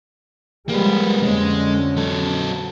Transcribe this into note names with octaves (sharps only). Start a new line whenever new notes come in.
F3 G3 G#3 A#3 B4
F2 D3 G#3 C#4
F#3 A4